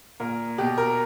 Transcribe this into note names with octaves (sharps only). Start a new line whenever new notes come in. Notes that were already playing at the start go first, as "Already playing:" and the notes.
A#2 A#4
B2 G4
A#4